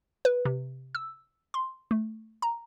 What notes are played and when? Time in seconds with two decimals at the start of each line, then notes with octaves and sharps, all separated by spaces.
0.25 B4
0.45 C3
0.95 E6
1.54 C6
1.91 A3
2.42 A#5